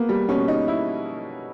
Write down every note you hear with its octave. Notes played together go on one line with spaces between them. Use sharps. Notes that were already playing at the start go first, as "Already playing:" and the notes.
Already playing: A#3 B3
G3
B2 C#4
D#4
E4